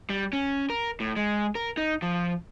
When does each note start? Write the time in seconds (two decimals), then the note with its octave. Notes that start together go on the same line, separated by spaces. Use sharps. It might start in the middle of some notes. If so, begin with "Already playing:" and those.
0.09 G3
0.33 C#4
0.70 A#4
1.00 A2
1.16 G#3
1.55 A#4
1.77 D#4
2.02 F3